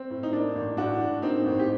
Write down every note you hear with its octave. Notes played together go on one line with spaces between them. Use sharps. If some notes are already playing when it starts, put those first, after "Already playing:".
Already playing: C4
A2
D#4
A#3 D4
A1
A2 D4 F#4
A2
A#3 C4 D#4
A1
G4